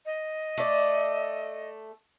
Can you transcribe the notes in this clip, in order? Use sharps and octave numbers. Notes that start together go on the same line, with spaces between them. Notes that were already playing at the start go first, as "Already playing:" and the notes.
D#5
A3 D5